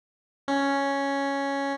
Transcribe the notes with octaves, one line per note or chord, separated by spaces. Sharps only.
C#4